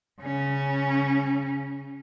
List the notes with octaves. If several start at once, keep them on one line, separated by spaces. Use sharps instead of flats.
C#3 C#4